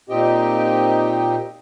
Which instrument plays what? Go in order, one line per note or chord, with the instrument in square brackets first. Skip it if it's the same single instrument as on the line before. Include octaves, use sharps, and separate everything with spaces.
[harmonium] A#2 C4 D#4 G4 D#5 G5